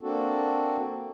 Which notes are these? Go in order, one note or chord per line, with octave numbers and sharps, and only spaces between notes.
A#3 C4 D4 F#4 A4